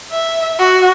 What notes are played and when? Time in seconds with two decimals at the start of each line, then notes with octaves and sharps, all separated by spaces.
0.12 E5
0.60 F#4